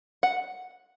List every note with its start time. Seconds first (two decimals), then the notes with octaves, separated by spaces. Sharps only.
0.23 F#5